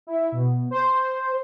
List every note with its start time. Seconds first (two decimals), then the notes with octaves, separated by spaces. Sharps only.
0.07 E4
0.32 B2
0.71 C5